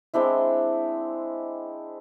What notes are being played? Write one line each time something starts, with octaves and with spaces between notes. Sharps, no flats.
G#3 C4 D4 E4